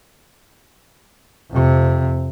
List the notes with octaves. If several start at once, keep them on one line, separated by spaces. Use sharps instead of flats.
F2 C3